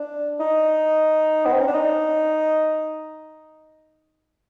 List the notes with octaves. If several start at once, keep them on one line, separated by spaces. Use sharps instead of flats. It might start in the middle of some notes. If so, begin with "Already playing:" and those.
Already playing: D4
D#4
B3
C4
C#4
D4
D#4